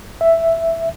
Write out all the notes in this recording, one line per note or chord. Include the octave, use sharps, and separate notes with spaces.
E5